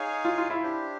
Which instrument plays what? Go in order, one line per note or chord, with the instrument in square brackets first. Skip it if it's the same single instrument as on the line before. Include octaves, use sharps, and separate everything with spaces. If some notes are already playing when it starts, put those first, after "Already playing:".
Already playing: [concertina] D#4 G#4 C#5 F5 G#5
[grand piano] F4
F4
E4
[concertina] D4 G4 C5